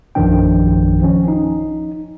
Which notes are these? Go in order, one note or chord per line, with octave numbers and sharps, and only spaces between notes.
A#1 F#2 D#3 F3 D4 G5
F3 C#4
D#4